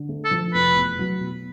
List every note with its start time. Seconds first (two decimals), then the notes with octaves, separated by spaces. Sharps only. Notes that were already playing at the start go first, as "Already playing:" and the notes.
Already playing: D3
0.09 A3
0.25 A4
0.31 F3
0.53 F1 B4
0.76 E2
0.99 F#3
1.20 B2